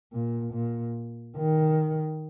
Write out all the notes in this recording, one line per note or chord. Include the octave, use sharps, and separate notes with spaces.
A#2
A#2
D#3